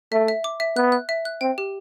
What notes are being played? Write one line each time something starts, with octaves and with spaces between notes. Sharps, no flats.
A3 E5
E5
D6
E5
B3 F#6
F#6
E5
F#6
C4 G5
G4